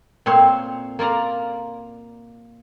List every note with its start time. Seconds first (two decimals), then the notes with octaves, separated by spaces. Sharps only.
0.26 A#2 C4 C5 C#5
0.99 A#3 F4 D5 A#5